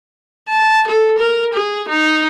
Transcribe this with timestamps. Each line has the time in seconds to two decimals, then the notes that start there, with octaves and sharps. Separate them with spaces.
0.49 A5
0.87 A4
1.18 A#4
1.53 G#4
1.89 D#4